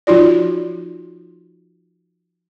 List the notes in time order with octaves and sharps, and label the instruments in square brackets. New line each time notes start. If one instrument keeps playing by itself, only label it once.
[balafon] F3 D#4 F4 F#4 D5